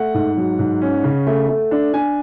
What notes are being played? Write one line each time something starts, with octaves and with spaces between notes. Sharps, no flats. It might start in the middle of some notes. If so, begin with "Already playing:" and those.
Already playing: A3 F#5
G#2
F#3
G#2
C#4
C#3
A3
A3
D4
D4 G#5